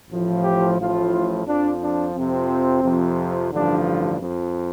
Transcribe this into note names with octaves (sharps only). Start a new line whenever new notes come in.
A1 A2 F3
G4
A1 A2 F3 F4
F2 F3 D4
D4
F2 C3 F3 C4
F2 C3 F3
A1 G2 D3 F3 D4
F2 F3